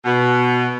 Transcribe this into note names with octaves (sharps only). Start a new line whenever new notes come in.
B2